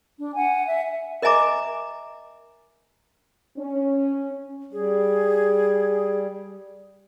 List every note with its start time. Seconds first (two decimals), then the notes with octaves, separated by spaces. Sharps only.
0.18 D4
0.34 F#5 G#5
0.67 E5
1.22 A#4 D#5 E5 G#5 A#5 D6
3.58 C#4
4.73 G3 G#4